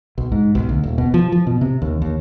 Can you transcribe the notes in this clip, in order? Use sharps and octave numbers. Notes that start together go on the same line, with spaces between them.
B1
G#2
B1
D2
D#1
B2
F3
F3
B2
C3
D#2
D#2